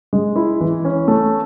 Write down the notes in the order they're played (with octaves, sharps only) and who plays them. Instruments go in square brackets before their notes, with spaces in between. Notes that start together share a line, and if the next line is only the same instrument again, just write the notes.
[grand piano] G#3
E4
E3
C#4
A3